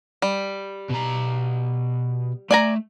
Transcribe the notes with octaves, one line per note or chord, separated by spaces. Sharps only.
G3
B2 A#5
A3 D5 G#5 A#5